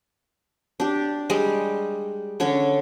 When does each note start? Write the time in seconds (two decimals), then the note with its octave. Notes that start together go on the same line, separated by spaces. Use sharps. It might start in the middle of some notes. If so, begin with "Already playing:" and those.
0.80 D4 G4
1.30 G3 G#3 G4
2.40 D3 C#4 C#5